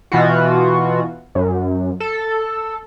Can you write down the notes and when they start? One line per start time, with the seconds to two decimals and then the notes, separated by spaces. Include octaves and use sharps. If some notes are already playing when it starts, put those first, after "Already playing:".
0.12 B2 E3 F4 F#4
1.35 F#2
2.00 A4